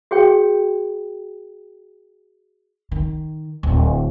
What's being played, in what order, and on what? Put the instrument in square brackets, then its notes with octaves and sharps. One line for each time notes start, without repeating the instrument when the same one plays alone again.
[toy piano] F#4 G#4 C#5 G5
[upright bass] D#3
D1